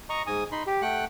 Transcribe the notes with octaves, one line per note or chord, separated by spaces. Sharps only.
D#5 A#5 C#6
G#2 G#5 D#6
D#4 B5 C6
G4
A3 F#5 G5 F#6